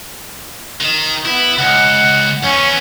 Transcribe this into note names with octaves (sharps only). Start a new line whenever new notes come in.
D#3
B3 E4
C#2 F#5
E2 B3 C#4